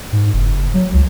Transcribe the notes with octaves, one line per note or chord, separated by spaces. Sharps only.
G#2
F#1
F#3
C#2